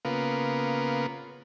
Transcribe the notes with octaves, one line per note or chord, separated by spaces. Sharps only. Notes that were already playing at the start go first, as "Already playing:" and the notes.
C#3 A#3 B3 F4 A#4 B4